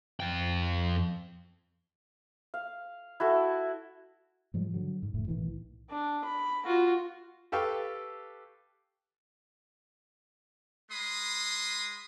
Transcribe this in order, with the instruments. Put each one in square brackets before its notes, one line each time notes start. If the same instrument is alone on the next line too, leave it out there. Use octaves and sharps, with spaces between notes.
[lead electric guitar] F2 G5
[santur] F5
E4 F#4 A4
[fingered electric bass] G#2 F3 G3 G#3
D3 F#3
G#2
E1 A2 A3
B1 A2 D#3 E3
[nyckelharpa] D4
B5
F4 F#4
[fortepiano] G4 A4 B4 F5 G5 C#6
[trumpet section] G#3 B5 C6 D#6